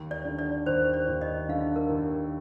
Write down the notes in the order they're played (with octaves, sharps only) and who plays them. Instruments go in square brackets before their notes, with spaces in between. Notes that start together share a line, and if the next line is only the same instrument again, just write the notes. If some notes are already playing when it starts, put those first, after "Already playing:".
Already playing: [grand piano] D#2
[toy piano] D5
[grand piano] D3
[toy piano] D5
[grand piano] D#2 [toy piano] C5
[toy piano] D5
[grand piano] D#2
[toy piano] D#5
[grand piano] D3 [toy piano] F5
[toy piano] A#4
[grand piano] D#2